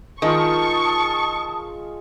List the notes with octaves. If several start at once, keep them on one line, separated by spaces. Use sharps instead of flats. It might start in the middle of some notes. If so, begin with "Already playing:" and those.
D#3 G#3 F4 A5 C#6 D#6